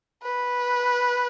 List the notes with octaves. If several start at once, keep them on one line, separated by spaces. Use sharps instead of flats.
B4